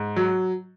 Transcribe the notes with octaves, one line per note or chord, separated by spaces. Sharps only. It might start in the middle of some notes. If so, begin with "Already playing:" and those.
Already playing: G#2
F#3